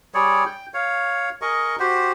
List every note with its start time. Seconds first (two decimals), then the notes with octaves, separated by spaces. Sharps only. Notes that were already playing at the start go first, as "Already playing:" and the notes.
0.14 G3 G#4 C#5 D5
0.46 G5
0.74 C#5 F5
1.42 G#4 A#4 D#5 C#6
1.79 F#4 G4 C5